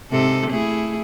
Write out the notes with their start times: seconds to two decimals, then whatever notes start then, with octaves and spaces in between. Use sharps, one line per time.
0.11 G#2 C3 A4
0.50 A3 E4 G#4